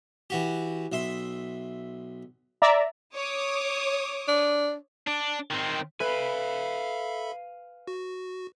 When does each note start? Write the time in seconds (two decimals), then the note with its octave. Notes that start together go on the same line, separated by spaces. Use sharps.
0.30 E3 F#4 G4
0.92 B1 E5 C6
2.62 D5 E5 A#5
3.16 C#5 D6 D#6
4.28 D4
5.07 D4
5.51 D#3 C4
6.00 A4 B4 E5 F5 G#5 B5
7.87 F#4